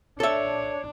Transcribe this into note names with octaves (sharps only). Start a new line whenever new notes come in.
D4 A4 C#5 E5